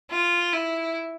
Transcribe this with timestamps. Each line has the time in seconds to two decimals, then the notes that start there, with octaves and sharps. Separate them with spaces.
0.11 F4
0.53 E4